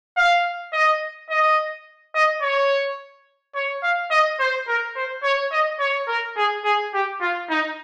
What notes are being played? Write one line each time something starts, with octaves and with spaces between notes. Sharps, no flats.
F5
D#5
D#5
D#5
C#5
C#5
F5
D#5
C5
A#4
C5
C#5
D#5
C#5
A#4
G#4
G#4
G4
F4
D#4